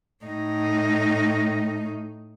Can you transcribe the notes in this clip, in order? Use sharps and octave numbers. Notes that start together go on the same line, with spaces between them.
A2 D#4